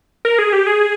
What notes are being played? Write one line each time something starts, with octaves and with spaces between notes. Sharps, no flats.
A#4
G#4
G4
G#4